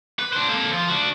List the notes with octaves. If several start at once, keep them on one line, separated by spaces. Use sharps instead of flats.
B4
D4 C5
A#3 A4
F3 F4
D4 F#4